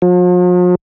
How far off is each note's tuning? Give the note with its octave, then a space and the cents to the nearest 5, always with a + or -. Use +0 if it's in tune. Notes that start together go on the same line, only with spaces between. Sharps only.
F3 +45